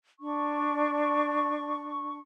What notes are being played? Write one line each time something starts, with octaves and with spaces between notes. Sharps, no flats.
D4 C#6